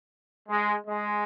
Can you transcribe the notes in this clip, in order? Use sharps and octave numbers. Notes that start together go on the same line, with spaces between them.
G#3
G#3